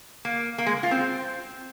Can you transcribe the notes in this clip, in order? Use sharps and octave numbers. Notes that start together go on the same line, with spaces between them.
A#3
A#3
G#3
F4
C4